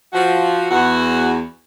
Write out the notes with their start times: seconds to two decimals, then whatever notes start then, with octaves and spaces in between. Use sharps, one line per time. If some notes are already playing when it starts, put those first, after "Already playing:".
0.13 F3 F#4
0.71 E2 F#4